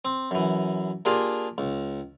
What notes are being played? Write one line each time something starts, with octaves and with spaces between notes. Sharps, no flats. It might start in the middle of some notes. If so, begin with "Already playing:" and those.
C4
F#2 E3
A#3 D4 F4 G4 G#4 A#4
C#2